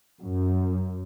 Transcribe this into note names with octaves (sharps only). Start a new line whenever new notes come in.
F#2